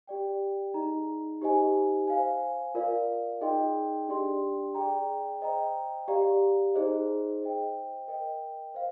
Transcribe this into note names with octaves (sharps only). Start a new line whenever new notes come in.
G4 D5 G5
D#4 G#4 D#5 A#5
D#4 G4 C5 D#5 G#5
C5 F5 G#5
F4 A#4 D5 F5
D#4 G#4 D#5 G5 C6
D4 G4 D5 G5 C6
G#4 D5 G5 A#5
C5 D#5 G5 A#5
G4 D5 F5 A#5
D#4 G#4 C5 D#5
C5 D#5 G5
A#4 D#5 G5
C5 F5